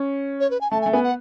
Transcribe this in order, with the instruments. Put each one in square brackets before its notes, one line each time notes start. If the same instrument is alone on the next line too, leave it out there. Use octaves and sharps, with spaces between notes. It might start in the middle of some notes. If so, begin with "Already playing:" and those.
Already playing: [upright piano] C#4
[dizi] C#5
B4
G#5
[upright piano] A3 [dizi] A5
[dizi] G#5
[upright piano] A3
[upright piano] B3 [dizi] G#5
[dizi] F#5